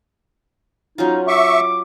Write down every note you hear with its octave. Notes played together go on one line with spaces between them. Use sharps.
F#3 C#4 D#4 F4
E5 C#6 D6